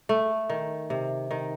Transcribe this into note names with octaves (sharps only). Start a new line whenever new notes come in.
A3
D#3
C3
D#3